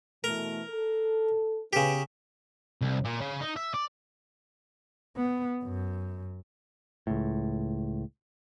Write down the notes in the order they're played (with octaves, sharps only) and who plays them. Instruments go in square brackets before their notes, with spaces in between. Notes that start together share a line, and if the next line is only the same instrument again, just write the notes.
[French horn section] B2 E3 A3 [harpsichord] A#4
[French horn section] A4
[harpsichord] C#3 G4 [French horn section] B3
[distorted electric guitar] C2
A#2
C#3
D#4
E5
D5
[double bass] B3
F#2
[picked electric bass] C#2 A2